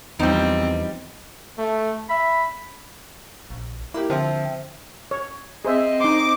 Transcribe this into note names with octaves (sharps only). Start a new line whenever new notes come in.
E2 F3 G3 C4 D#4
A3
E5 B5
A#1
A#3 E4 G4
D3 F3 C4 C5 E5
C#5
C4 G#4 C5 D#5 E5
D#4 C6 D6